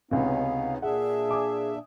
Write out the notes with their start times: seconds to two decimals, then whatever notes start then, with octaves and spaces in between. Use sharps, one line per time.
0.11 C#2 C3 B3 C#4 D#4 F5
0.82 A#2 D4 G#4 E5 F#5
1.29 G#5 D6 D#6